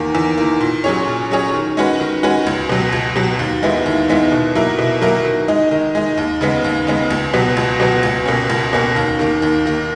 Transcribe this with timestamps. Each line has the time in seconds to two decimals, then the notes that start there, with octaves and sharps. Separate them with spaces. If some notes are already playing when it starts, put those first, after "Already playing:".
Already playing: E2 D#3 A#3
0.15 E2
0.37 D#3 A#3
0.61 A#2
0.84 F#3 C#4 G#4 C#5
1.08 A#2
1.31 F#3 C#4 G#4 C#5
1.54 D#3
1.77 G#3 C#4 F#4 B4
2.00 D#3
2.23 G#3 C#4 F#4 B4
2.47 C#2
2.69 B2 F#3
2.93 C#2
3.16 B2 F#3
3.39 D#2
3.63 D#3 G#3 B3 E4
3.86 D#2
4.08 D#3 G#3 B3 E4
4.32 B2
4.55 F#3 A#3 E4 A#4
4.79 B2
5.02 F#3 A#3 E4 A#4
5.25 D#3
5.48 G#3 D#4
5.71 D#3
5.95 G#3 D#4
6.17 D#2
6.41 C#3 G#3 B3
6.64 D#2
6.87 C#3 G#3 B3
7.11 C#2
7.33 B2 F#3 B3
7.57 C#2
7.80 B2 F#3 B3
8.03 C#2
8.26 B2 A#3 C#4
8.50 C#2
8.73 B2 A#3 C#4
8.96 D#2
9.19 D#3 A#3
9.42 D#2
9.66 D#3 A#3